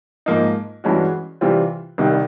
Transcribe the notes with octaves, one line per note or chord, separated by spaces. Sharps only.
G#2 F3 A#3 D#4
G2 E3 G#3 C#4 F#4
C3 E3 G3 C4 F4
C2 C3 D#3 G3